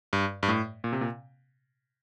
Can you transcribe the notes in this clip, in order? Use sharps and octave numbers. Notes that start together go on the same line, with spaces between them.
G2
G2
A2
A#2
C3
A#2